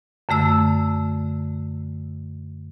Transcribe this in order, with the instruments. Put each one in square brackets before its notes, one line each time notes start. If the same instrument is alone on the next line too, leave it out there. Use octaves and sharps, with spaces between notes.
[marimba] F#2 D3 A3 E6